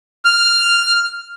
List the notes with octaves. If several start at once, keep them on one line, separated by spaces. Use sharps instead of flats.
F6